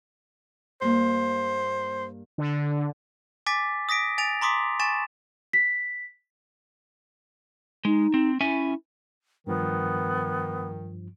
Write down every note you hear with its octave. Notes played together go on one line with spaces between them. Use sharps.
G2 A#3 C5
D3
G#5 D6 A6 B6
D#6 A#6 B6 D7
G#5 A6 D7 F7
A#5 C6 D6 D#6 B6
G#5 C#6 A6 E7
B6
G#3 D#4
C4
C#4 E4 E5 G#5
G2 D#3 F3 B3